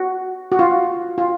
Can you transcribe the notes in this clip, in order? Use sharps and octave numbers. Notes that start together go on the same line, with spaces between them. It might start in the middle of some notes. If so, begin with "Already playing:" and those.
Already playing: F#4
F#4
F4
F4